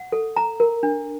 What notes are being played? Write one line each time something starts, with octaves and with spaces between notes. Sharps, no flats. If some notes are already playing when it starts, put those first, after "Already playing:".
Already playing: F#5
A4
A#5
A#4
D4